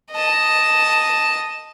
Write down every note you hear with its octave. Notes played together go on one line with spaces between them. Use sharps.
D#5 A5